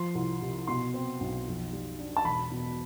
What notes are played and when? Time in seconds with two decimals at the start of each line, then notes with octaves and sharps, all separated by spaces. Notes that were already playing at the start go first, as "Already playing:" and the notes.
Already playing: F3 C6
0.15 C2
0.42 C3
0.67 B2 C6
0.94 C4
1.21 B1
1.47 F2
1.72 G3
1.99 D4
2.17 A5
2.25 E1 B5
2.51 B2